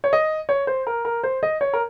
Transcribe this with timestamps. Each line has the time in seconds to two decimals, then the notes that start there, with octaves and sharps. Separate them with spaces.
0.04 C#5
0.13 D#5
0.49 C#5
0.67 C5
0.87 A#4
1.05 A#4
1.24 C5
1.43 D#5
1.61 C#5
1.73 A#4